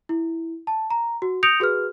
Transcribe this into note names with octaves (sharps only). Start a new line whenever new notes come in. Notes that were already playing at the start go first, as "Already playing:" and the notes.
E4
A5
A#5
F#4
D#6 G6 A#6 C#7 D7 F7
F#4 G#4 B4 F6